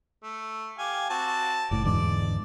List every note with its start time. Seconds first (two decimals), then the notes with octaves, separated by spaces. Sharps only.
0.23 A3
0.78 G4 F5 G#5
1.10 C4 F#4 A5
1.71 F#1 A2 D5
1.85 E2 G#2 D3 D5